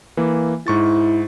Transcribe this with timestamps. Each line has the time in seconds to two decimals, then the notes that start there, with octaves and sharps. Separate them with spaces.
0.17 E3 A#3
0.67 G#2 E4 C#6 A6